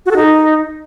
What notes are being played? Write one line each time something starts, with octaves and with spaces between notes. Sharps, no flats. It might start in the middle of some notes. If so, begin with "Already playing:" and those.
F#4
A4
D#4